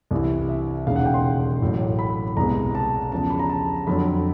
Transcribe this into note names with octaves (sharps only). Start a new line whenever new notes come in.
C2 C3 E3
E5
E1 D#2 C#3 F5
F#5
G5
C6
A1 A2 F#3
B5
C2 B2 G#3 B3 A#5
A5
E2 C#3 F3 A5
B5
A#5
A5
F2 D3 F#3 B5